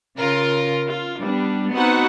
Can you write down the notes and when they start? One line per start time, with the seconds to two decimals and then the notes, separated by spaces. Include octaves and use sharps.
0.17 C#3 F4 A#4
0.86 F4
1.22 G3 B3 D4
1.74 B3 C4 D#4 F#4 B4 F#5